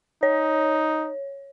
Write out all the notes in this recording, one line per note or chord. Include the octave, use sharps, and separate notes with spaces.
D#4 C#5